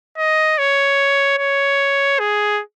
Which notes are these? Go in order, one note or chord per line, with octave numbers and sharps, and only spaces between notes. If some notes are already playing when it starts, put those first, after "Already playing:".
D#5
C#5
C#5
G#4